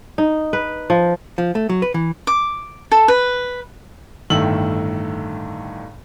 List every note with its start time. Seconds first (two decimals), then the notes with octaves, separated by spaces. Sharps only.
0.18 D#4
0.53 B4
0.90 F3
1.38 F3
1.55 A3
1.69 F#3
1.82 B4
1.94 E3
2.27 D6
2.92 A4
3.08 B4
4.30 G1 A2 D#3 A3 E6 F#7